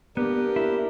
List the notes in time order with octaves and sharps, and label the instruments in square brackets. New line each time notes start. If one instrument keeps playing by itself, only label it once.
[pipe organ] A#3 D4 A#4 [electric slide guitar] B3 [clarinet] G4
[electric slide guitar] E4